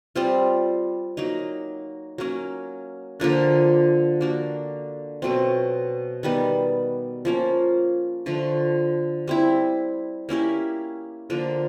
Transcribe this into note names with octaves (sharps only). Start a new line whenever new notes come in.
G3 C4 F4
F#3 A#3 D#4
F#3 A#3 C#4
D3 F3 A#3 D4
A#3 D4 F#4
B2 F#3 A3 C4
D#3 G3 B3
F3 A#3 C#4
D3 F3 A3
G3 C4 E4
A#3 C#4 E4 G4
D3 F3 A#3 D4